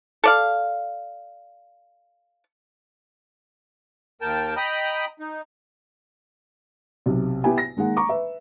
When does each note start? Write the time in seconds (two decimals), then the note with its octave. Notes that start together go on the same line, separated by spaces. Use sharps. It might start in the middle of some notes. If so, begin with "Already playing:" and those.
0.24 A4 D5 F5
4.21 D#2 A#4 G5 A5
4.57 D#5 G5 A#5 B5 D#6
5.20 D#4
7.06 B1 C3
7.44 B3 E4 G4 G5 G#5
7.58 A#6
7.77 D#3 G#3 A#3 F#5
7.96 A#5 C#6 D6
8.09 B4 E5